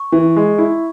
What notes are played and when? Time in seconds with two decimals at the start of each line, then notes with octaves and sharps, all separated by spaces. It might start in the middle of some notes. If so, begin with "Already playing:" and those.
Already playing: C#6
0.12 E3
0.36 G#3
0.58 E4